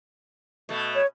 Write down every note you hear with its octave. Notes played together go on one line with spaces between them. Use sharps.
B2 A3
C#5